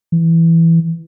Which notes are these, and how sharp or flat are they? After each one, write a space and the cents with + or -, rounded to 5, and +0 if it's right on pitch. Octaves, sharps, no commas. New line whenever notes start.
E3 +5